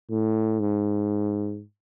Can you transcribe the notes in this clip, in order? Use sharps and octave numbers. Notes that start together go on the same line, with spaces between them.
A2
G#2